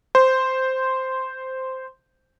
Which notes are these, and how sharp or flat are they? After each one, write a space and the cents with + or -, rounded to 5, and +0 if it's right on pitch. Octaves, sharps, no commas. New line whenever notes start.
C5 -5